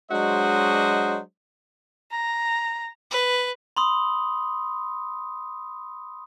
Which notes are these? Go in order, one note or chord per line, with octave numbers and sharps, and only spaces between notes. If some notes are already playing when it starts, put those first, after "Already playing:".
F#3 G#3 D4 F#4 C5 D#5
A#5
B4
B5 C6 D#6